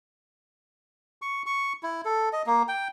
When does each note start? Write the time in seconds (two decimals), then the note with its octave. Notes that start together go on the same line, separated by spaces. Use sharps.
1.22 C#6
1.46 C#6
1.83 E4
2.05 A4
2.33 D#5
2.46 A#3
2.68 G5